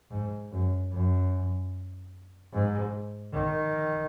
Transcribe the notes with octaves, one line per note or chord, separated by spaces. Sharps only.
G#2
F#2
F#2
G#2
D#3